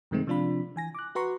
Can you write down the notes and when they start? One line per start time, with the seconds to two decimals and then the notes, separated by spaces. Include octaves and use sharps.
0.11 F#2 C3 D#3 G#3 A3 C4
0.27 C3 F3 D4 F4 B5
0.76 E3 G#5 A#6
0.95 D6 F#6
1.15 F#4 B4 F#5 A#5 C6 C#6